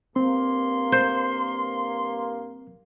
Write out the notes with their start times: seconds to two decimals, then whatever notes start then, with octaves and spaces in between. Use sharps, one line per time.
0.16 G2 A#3 C4 C6
0.92 C5